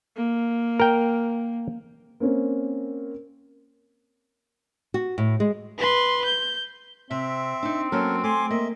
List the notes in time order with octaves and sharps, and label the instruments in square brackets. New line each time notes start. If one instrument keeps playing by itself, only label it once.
[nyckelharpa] A#3
[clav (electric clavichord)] A#4 G5
[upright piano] A#3 C4 C#4 A#4
[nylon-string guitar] F#4
A2
G#3
[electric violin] B4 C6
G6
[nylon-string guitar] C3 [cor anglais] C4 [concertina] E5
[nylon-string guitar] D4 D#4
[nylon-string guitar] F#3 A#3 C#4 [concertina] A4 A#4
[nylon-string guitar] A3 [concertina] G#5 C6 D6
[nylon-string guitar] A#3 [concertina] D#5 E5